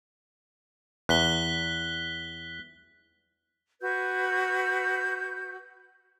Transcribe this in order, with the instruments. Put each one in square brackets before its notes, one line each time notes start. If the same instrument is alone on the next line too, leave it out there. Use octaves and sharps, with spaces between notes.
[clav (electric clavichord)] E2 [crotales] F#6 B6 G7
[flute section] F#4 B4 E6 G6